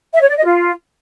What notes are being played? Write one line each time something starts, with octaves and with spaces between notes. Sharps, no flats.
E5
C#5
D5
D#5
F4